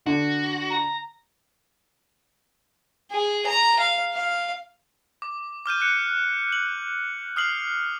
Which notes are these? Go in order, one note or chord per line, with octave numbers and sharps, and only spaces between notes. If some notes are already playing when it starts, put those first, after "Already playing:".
D3 F#4
A#5
G#4
A#5
F5
F5
D6
D6 F6 G6 D#7
F#6 C#7
F#7
D#6 F6 C7 F#7